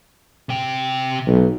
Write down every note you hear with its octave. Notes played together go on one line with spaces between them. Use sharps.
C3 G5
B1